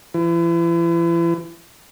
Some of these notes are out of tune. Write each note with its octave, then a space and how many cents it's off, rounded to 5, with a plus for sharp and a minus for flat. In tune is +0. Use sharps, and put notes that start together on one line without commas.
E3 +40